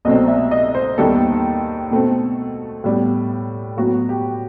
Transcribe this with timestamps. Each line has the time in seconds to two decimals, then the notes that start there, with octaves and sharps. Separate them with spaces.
0.05 C2 B2 F#3 A3 C4 D#5
0.28 E5
0.51 D#5
0.75 C5
0.98 D#2 D#3 G3 B3 A4
1.91 B2 A3 C4
2.84 A2 G3 B3
3.77 A2 F#3 B3 F#4
4.09 G4